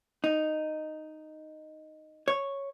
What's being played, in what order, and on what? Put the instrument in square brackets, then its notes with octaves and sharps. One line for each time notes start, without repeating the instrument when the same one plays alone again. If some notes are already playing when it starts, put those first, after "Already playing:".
[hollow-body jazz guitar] D#4
C#5